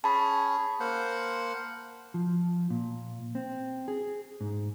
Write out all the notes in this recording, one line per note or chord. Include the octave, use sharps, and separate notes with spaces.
C#4 G#4 A5 B5
A#3 C5 F#5
F3
A#2
C4
G#4
G#2